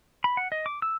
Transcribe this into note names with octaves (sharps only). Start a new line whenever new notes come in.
B5
F#5
D#5
D6
E6